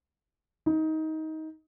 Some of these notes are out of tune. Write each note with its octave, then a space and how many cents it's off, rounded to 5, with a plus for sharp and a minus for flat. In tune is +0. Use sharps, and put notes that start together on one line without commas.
D#4 +20